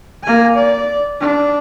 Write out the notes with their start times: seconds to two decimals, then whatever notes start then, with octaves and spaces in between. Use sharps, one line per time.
0.23 A#3 G#5
0.54 D5
1.20 D4